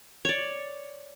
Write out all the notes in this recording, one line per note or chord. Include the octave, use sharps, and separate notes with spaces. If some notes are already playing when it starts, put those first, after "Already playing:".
C#5 D5